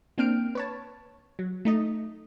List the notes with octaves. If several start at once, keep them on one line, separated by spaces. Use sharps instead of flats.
A#3 C4 D4 G5 F6 D7
B4 C#5 A5
F#3
A3 D#4 D#5